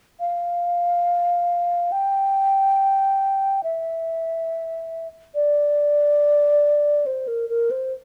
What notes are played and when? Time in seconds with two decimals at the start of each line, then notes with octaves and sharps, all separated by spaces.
0.20 F5
1.92 G5
3.63 E5
5.35 D5
7.06 C5
7.27 A#4
7.49 A#4
7.71 C5